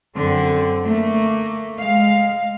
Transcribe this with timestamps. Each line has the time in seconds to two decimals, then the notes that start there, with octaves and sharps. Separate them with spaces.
0.17 F#2 D3 C4
0.85 A3 A#3
1.79 G#3 F5